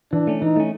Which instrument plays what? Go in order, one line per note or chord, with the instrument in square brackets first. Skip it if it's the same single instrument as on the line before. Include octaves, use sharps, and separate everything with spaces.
[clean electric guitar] E3 [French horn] D4
[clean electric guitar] A3 C#4
[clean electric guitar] E3 [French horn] D#4
[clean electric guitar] A3 C#4